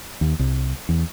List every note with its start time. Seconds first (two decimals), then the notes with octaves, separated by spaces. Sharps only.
0.21 D#2
0.39 C2
0.89 E2